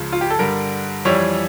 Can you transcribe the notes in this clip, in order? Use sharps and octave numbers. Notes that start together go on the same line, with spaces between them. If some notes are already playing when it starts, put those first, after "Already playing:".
Already playing: C#2 C#3 F3
F4
G4
A4
G2 D3 G3 A#4
F2 E3 G3 C#5